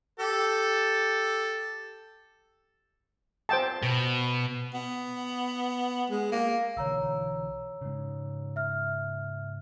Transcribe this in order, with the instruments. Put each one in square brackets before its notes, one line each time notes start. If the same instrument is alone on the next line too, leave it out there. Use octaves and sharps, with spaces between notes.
[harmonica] G4 A4
[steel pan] C5 G5 A5
[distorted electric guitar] B2
[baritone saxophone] B3
G#3
A#3
[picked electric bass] B1 D3 E3 [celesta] C#5 A#5 E6
[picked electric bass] G#2 C#3
[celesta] E5 F6